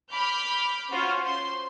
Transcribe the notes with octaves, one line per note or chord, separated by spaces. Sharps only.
B5 D6 F6 G6
C#4 F4 F#4 C5
C5 C6